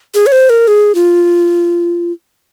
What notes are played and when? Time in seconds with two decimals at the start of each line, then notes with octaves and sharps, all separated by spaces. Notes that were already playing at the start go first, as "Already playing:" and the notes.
0.14 G#4
0.26 C#5
0.32 C5
0.50 A#4
0.68 G#4
0.95 F4